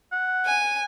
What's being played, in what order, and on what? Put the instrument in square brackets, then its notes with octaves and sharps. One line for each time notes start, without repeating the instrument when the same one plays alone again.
[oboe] F#5
[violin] G#5